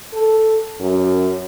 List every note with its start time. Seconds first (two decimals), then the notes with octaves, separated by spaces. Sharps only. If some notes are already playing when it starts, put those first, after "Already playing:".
0.13 A4
0.80 F#2